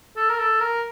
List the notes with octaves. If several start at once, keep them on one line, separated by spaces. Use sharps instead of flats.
A4
A#4
A4
A#4